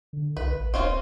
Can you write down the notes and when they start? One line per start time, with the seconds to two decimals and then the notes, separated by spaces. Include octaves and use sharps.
0.13 D3
0.37 C2 B4
0.56 A1
0.74 D1 C4 C#4 F4